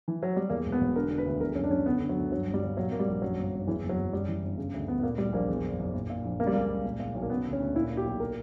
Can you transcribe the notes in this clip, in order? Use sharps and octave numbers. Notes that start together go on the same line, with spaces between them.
E3
F#3
G3
E2 A#3
E1
B3
E1
D3 A#4
D3
B4
D2
E2 A#4
F#1 C#4
D4
F#1 C#4
D3 B3
D3
F#3
D2
G2 F#3
G1
G3
G1
A#2 F#3
A#2 A#3
G3
A#1
F#2 F#3
G1
G1
E2 E3
F#1
F#3
F#1
F#2 G3
E3
G1
C#3
D2
D2 B3
B3
A#2 A#3
A#2 G3
A#1 A#3
E2
F#1
F#1
A#2
A#2
A#1
C#3 A#3
G3
C#2 A#3
C#2
A#2
A#2
B1
A#3
C#3 B3
D2
C#4
D2
A#2 E4
A#2
G4
B1
A#4